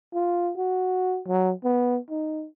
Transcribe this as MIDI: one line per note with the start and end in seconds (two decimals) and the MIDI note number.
0.14 0.52 65
0.57 1.21 66
1.27 1.52 54
1.64 1.99 59
2.10 2.46 63